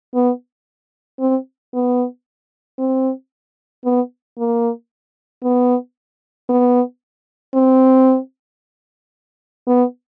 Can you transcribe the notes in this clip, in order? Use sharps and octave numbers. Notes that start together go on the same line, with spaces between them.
B3
C4
B3
C4
B3
A#3
B3
B3
C4
B3